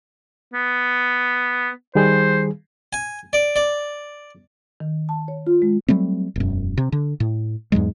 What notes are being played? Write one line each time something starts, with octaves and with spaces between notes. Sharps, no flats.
B3
D#3 G3 G#4 C5
G#5
D5
D5
D#3
A5
C#5
F4
G#3
F#3 G3 A3 C4
E1 F#2
C3
D3
A2
E2 G#2 F#3 G#3